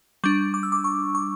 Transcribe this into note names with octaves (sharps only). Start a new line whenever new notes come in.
G3 D4 C#6
D6
E6
D6
C#6
C#6